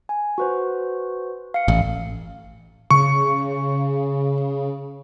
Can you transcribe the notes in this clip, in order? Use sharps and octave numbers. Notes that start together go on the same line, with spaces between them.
G#5
F#4 B4 C5
F5 C#7
A1
C#3 C#6